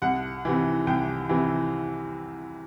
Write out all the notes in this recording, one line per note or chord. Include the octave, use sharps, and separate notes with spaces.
C2 F#5
C3 E3
C2 G5
C3 E3